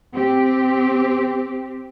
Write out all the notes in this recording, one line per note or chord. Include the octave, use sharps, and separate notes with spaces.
C4 G4